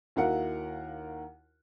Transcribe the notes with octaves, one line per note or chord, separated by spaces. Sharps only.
D#2 E4 F#4 A#4 F5 F#5